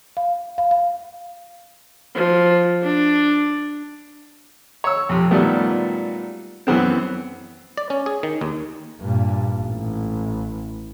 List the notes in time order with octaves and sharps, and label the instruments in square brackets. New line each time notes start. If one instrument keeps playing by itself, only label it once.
[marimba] F5
F5
F5
[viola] F3
D4
[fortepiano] C#5 E6
F2 C3
A#2 D#3 F#3 G3 A3 B3
F#2 E3 B3 C4
[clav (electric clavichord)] D5
C#4
G#4
D#3
D#2
[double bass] G2 A#2
A1